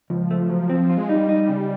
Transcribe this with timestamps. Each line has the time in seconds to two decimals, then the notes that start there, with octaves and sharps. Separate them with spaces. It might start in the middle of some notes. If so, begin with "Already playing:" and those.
0.10 C#2 F3
0.31 A3
0.49 F#3
0.70 C4
0.90 F4
0.97 G#3
1.09 G3 D#4
1.29 D#4
1.49 C#3